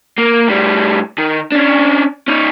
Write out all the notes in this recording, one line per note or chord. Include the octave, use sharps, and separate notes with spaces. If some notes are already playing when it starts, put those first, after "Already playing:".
A#3
A2 G3
D#3
C#4 D4
C#4 D#4